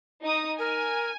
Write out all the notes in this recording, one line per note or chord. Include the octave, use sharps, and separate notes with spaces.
D#4 D#6
A#4 G#5